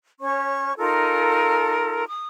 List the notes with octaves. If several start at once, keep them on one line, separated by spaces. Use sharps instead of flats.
C#4 C#5 C#6
D#4 F4 A4 A#4
D#6